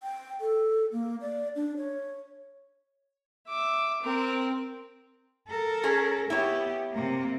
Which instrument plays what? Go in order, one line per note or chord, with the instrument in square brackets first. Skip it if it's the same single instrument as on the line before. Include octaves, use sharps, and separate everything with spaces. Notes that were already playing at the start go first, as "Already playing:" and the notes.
[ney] G5
A4
A#3
D5
D4
C#5
[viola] E5 D6
C4 A#4
[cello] A4 A#4
[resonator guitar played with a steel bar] C#4 G#4
[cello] B3 G4 [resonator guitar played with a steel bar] E4 C#5
[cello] C3 A#3